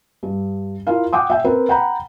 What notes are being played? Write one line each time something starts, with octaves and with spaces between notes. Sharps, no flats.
G2
E4 F4 A#4 F5
F#5 G5 D6 D#6
E5 G5
C4 A#4 B4
F#5 G5 A#5 B5